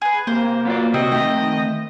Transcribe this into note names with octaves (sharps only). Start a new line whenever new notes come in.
G#4 B4
C3 A#3 C5
F#3 B3 F4 D5
C3 C4 F#4 D#5
D#3 A3 C4 E5 G5